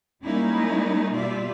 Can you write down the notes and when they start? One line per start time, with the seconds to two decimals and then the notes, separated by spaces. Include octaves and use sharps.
0.22 G3 G#3 A#3 C#4 D#4 E4
1.14 B2 G3 F4 D5 E5